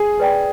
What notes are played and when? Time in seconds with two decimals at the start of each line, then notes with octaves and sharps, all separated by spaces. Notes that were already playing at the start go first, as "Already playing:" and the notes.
Already playing: G#4
0.20 B4 D5 G5